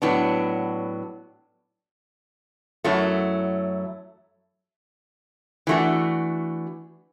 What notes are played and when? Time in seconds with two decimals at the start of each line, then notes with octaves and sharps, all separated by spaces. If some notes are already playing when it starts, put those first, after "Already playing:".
0.02 A2 F#3 B3 D4
2.84 F#2 F#3 A3 E4
5.67 E3 A3 D4 F#4